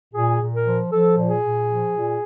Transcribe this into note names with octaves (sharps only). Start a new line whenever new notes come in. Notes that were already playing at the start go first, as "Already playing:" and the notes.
A#2 G#4
A#2
A#4
F3
F3 A4
A#2
G#4
A#2
F3
A#2